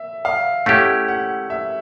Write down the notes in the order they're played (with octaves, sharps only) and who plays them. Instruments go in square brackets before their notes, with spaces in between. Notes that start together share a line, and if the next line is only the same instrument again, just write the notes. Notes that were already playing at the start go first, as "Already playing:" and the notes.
Already playing: [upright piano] E5
F5
[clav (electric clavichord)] A3 C#4 E4 G4 [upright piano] F#5
[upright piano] F#5
E5